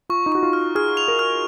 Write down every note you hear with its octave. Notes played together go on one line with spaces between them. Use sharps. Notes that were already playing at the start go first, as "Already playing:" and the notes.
F4 C#6
D#4
F#4 C#6
F4
F6
G#4 F6
F7
A#4
F6